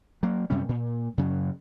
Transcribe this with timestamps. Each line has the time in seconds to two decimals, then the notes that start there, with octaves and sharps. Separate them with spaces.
0.23 F#3 A#3
0.50 F#2 C3 G3 C#4
0.69 A#2
1.18 F#2 C#3 F#3